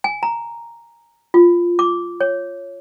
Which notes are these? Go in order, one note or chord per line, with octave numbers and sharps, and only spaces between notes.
G#5
A#5
F4
D6
C#5